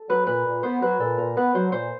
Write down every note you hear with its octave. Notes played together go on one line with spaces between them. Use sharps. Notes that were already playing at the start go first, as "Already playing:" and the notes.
Already playing: A4
F#3 B4
A#2 B4
A#2
B3 C5
F#3 B4
A#2 A4
A#2 A#4
B3 B4
F#3 C5
A#2 C5